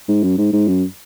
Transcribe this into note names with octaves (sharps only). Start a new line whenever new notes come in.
G#2
F#2
G#2
G#2
F#2